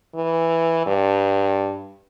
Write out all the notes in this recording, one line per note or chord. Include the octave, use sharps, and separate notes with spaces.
E3
G2